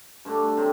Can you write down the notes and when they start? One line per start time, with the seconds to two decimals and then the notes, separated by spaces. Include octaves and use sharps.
0.25 G2 D3 A3 D4
0.57 C3 F#3 C4